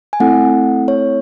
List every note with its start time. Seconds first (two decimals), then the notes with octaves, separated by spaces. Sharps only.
0.13 G#5
0.20 A3 C4 E4 A4 F#5
0.88 C#5